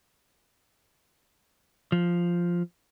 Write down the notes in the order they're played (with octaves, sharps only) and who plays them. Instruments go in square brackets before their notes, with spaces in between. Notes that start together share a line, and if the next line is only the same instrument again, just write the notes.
[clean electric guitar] F3